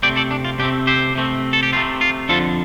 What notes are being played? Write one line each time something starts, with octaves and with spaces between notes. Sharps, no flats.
C3 A3 C4 D5 G5
A4 D5
D4
F4
C3 A3 C4 D4 G4
G4 C5
C3 A3 C4
A4
G4
C3 A3 C4 F4
F4
F2 D3 F3 D4 F4 A4